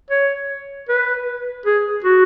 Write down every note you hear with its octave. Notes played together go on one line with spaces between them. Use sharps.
C#5
B4
G#4
F#4